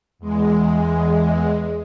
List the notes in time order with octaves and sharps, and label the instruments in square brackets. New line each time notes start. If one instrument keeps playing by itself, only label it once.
[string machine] E2 G#3